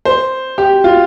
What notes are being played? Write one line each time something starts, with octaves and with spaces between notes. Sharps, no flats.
C5
G4
F4